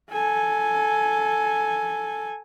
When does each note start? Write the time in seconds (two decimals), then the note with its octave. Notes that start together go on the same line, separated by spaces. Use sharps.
0.12 A4 G#5